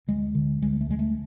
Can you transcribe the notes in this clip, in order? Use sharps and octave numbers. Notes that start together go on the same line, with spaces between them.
D2 G#3
D3
D2 G#3
A3
D3 G#3
A3